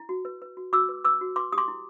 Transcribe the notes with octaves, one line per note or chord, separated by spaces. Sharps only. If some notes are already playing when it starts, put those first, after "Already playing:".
Already playing: E4
F#4
B4
B4
F#4
F#4 D6 E6
B4
B4 D6 E6
F#4
B4 C6 D6
G4 D#6
C6 D6
E4